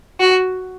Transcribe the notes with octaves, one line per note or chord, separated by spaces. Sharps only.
F#4